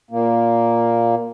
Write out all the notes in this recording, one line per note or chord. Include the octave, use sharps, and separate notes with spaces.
A#2 A#3